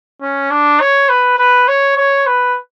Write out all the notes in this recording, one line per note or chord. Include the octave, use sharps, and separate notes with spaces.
C#4
D4
C#5
B4
B4
C#5
C#5
B4